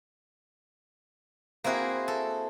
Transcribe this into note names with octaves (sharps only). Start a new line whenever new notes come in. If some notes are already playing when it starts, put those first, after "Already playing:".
A#3 C4 E4 F#4 G#4 A#4
A4